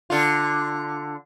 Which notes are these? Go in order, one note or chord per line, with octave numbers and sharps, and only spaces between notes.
D3 F4